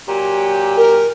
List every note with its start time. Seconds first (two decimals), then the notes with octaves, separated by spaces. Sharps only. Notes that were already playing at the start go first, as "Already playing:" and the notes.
0.07 A#2 F#3 G4
0.77 A#4